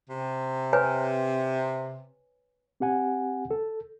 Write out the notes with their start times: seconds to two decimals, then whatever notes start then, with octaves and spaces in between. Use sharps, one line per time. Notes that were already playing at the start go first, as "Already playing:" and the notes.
0.10 C3
0.73 B4 C#5 G#5
2.80 C4 G4 F#5 G#5
3.51 A4